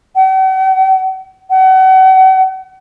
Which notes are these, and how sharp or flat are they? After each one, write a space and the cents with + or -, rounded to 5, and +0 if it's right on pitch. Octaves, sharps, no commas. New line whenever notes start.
F#5 +45
F#5 +35